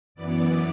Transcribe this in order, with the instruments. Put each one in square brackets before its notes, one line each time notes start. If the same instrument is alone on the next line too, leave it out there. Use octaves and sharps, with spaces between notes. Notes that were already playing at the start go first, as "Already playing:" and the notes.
[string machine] F#2 E3 B3 D5